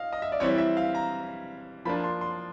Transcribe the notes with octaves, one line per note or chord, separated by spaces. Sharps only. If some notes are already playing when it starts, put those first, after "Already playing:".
Already playing: D#5 F5
D#5
E5
D5
E3 G3 C4 E4 C#5
E5
F5
A#5
F3 A#3 D4 B5
C6
C6